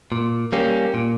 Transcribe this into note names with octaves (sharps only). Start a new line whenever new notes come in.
A#2
G3 A#3 C#4 G4
A#2